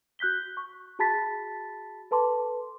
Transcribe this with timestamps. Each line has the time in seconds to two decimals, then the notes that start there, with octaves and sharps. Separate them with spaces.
0.19 F#4 F#6 G6 B6 G7
0.57 C#6
0.99 F#4 G#4 A5 B5 A6 B6
2.11 A4 B4 A5 C6 D6